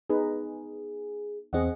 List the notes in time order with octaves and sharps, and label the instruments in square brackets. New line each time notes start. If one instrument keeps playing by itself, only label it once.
[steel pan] B3 D#4 B4 [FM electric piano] G#4
[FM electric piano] E2 C4 [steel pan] G#4 D#5 F#5